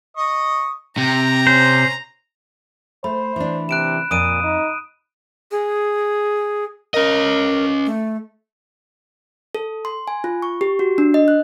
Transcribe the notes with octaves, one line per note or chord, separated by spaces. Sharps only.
D#5 C#6 D#6
C3 G5 A#5
C#4 C5
A3 C5 B5
E3 D4
C3 F#6 D7 E7
F2 A#2 D#6 D7 D#7
D#4
G#4
C#4 A#4 D#5
A3
A4
C6
G#5
F4
C#6
G4
F#4
D4
D#5
F#6